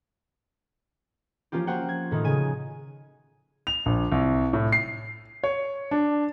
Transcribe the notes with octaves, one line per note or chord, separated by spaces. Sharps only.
F3 A#3 C#4 F4 G4
A#3 F4 F#4 C5 F#5 G5
G#6
A2 D#3 F3 D#4
C#3 G#5 D#7
F7
A#1
C2
A2
C7
C#5
D4